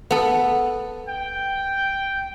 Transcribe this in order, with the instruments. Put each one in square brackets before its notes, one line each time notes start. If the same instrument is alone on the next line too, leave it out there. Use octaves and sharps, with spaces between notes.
[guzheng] B3 A4
[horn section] G5